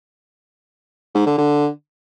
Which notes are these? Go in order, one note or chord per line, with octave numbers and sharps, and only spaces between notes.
G#2
D3
D3